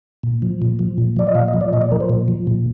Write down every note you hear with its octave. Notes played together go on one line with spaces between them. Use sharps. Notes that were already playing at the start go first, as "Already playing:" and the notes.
A#2
F3
A#2
F3
A#2
F3 D5
D#5
A#2 F5
D#5
F3
D5
A#2 D#5
D5
F3 A#4
C5
A#2
F3
A#2